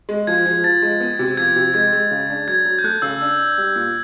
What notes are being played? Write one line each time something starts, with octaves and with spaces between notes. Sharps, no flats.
G#3
F3 G#6
F3
F3 A6
G#3
B3
C3
F3 G#6
C3
G#3 G#6
G#3
C#3
D4
F#3 G#6
F#3
G6
A3 F#6
C#3 E6
D4
D4
G3
A#2